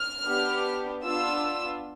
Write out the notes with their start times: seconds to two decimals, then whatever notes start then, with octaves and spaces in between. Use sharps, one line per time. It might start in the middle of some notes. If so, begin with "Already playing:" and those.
Already playing: F6
0.25 B3 D4 G4
1.04 B3 D4 F4 E6